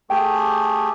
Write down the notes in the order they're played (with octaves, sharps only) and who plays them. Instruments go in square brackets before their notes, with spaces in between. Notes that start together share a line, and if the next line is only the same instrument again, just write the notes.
[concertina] A3 G4 G#4 [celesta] G5